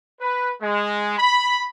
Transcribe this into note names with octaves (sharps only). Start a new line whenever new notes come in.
B4
G#3
B5